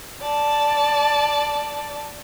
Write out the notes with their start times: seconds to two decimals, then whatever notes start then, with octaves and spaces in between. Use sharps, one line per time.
0.22 D5 A5